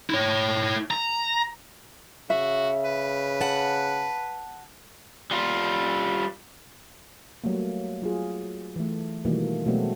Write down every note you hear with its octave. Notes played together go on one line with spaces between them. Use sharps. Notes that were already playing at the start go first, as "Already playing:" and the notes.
E4 C#5
A#5
C#3 F#4 E5
B4
F#5 A5
G3 F4
F#3 G3 A3 A#3
F#3 F4 G#4
E3 A3
B2 D#3 E3 G3 A3 A#3
B2 F#3 G#3 A3 B3 C4